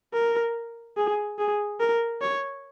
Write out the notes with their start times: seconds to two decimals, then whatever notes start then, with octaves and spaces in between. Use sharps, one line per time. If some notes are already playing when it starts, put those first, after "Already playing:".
0.13 A#4
0.97 G#4
1.39 G#4
1.80 A#4
2.21 C#5